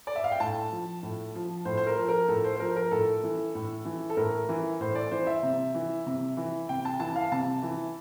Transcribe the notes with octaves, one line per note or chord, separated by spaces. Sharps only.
D5
E5
F5
G5
A2 A5
F3
A2
F3
A2 C5
C5
A#4
F3
A#4
A2 A4
C5
C5
F3 A#4
A#4
A2 A4
E3
A2
E3
A4
A2 A#4
E3
A2 C5
D5
E3 C5
E5
C3
E3
C3
E3
C3 G5
A5
E3 A5
F5
C3 A5
E3